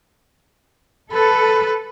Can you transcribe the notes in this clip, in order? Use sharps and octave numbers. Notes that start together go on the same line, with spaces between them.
A4 B4